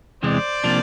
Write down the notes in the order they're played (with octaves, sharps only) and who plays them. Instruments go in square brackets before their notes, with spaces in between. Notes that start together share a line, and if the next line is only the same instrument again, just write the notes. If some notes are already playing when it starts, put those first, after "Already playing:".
[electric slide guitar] E2 C3 E3 G#3 [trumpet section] C5 D5
[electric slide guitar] C3 F3 A#3 D4